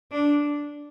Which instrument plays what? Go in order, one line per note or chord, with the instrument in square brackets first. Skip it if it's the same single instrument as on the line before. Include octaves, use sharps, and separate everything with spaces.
[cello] D4